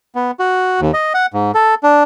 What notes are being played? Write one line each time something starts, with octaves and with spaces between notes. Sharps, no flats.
B3
F#4
D#2
D#5
F#5
G#2
A4
D4